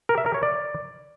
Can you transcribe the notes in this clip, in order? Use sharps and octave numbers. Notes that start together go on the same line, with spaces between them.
A#4
E5
A#4
C#5
D5